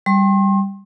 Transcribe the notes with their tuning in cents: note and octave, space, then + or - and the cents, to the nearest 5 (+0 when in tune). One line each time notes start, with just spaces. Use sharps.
G3 +0 C6 +40